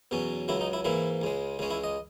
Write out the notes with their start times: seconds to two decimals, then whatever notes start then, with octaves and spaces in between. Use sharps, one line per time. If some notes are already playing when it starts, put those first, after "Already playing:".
0.11 E2 B2 F#3 C#4
0.48 C#2 C#3 F#3 E4
0.61 D#4
0.73 E4
0.85 G#2 E3 A#3 E4
1.22 C#2 C#3 G#3
1.59 C#2 C#3 G#3 C#4
1.71 E4
1.84 D#5